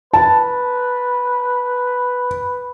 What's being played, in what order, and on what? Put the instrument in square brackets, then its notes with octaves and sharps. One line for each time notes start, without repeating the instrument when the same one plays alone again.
[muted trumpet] B4 [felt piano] A5